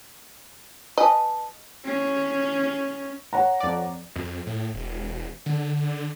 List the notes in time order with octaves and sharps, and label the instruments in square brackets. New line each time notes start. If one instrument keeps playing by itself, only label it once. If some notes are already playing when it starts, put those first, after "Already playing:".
[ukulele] B4 G#5 A5 [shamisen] D#5
[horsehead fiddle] C#4
[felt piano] C#5 F#5 A#5
[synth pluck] F2 D5
[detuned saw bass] F2
A2
E1
D3